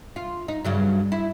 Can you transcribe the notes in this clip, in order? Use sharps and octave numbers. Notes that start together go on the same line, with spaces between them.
F4
D#4
G2 C#3 F#3
E4